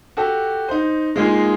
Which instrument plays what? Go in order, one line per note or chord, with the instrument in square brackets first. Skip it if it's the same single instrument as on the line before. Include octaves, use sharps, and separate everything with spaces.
[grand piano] F#4 G4 A4
D#4 C5
G#3 A#3 D#4 F4 G#4